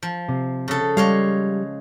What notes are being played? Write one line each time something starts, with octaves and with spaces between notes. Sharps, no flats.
F3
C3
C#3 A4
G3 G#3 C#5 F5